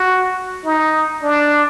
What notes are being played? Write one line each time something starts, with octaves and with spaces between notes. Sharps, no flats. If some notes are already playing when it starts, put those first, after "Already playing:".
Already playing: F#4
D#4
D4